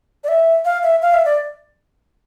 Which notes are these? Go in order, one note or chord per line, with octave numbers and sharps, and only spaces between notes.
D5
E5
F5
E5
F5
E5
D5